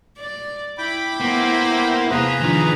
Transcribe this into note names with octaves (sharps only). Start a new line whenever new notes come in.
D5
E4 G5 B5 D6
A#3 B3 E4 C5
E2 C3 A#3 G#4 B4 C5 F5 A#5
D#3 F3 D4